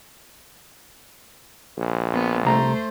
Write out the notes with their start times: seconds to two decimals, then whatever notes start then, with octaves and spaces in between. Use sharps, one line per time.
1.77 A#1
2.13 B3
2.45 C2 A3 C5 A#5